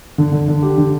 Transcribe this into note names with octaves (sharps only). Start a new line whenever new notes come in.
D3
D3
D3
G4
D3